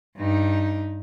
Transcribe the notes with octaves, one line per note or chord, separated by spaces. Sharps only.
G2 D#4